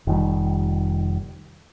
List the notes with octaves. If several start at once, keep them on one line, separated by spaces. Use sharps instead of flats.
F1 D#3 G3